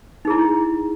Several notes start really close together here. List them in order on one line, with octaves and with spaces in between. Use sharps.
D#4 G#4 E4